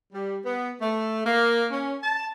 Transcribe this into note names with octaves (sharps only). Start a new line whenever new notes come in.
G3
B3
A3
A#3
C#4
A5